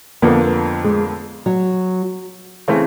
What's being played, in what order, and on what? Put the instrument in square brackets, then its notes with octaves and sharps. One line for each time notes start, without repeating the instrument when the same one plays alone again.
[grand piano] F2 D3 F3 A#3 [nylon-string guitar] B3
[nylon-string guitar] G#3
F#3
[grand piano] C#3 E3 A3 C4